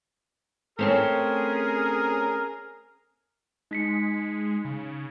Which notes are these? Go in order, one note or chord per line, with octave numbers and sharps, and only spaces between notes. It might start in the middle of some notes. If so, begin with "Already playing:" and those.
A3 C4 C#4 G#4 A#4
G#3 D#4 B6 C#7
C#3